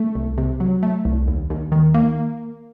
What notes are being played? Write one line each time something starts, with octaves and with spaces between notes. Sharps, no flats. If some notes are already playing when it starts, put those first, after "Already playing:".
Already playing: A3
C2
C3
F#3
A3
C2
D#2
D#2
D#3
A#3